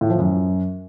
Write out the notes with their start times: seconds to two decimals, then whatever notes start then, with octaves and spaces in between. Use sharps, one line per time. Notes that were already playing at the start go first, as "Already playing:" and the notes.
0.01 A2
0.10 F3
0.18 F#2